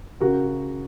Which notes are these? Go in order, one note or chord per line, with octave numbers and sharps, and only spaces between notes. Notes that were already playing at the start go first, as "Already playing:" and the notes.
C#3 F#4 A#4